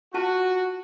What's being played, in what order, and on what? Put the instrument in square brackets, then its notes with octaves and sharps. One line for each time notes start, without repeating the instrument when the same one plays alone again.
[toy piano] F4 A5 [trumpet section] F#4